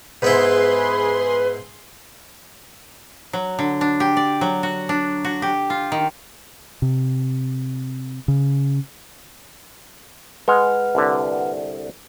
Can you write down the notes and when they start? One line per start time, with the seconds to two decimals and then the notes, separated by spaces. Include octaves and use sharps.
0.22 G#2 B3 E4 G#4 B4 C6
3.33 F#3
3.59 D3
3.81 D4
4.00 G4
4.17 D5
4.41 F#3
4.63 F#4
4.89 D4
5.25 F#4
5.42 G4
5.70 F4
5.92 D#3
6.82 C3
8.28 C#3
10.48 G#3 B4 F#5 F6
10.95 C2 D3